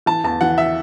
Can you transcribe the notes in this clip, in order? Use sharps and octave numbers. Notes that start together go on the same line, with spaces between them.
E3 A5
E2 A5
E3 F#5
E5